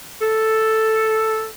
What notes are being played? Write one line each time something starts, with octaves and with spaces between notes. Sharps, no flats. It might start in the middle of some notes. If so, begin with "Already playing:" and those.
A4